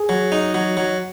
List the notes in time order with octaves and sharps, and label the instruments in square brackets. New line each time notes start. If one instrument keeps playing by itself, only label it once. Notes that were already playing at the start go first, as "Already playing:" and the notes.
Already playing: [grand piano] G#4
[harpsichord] F#3
D#4
F#3
F#3